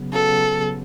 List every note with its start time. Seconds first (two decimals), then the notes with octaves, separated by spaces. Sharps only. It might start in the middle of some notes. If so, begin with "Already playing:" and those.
Already playing: C#3 F#3 B3
0.13 C#3 F#3 B3 A4